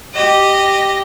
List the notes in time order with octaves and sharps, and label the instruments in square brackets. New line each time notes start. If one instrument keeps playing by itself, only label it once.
[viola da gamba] G4 [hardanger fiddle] D#5